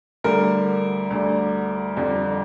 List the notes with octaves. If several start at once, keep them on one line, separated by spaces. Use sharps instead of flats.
D2 D3 G3 A#4
D2 D3 G3
F2 D3 G3